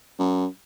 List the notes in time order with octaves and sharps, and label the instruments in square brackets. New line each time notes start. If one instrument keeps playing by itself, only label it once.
[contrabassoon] F#2